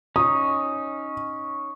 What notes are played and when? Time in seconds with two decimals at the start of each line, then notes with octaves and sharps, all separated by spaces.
0.16 C#4 D#4 D#6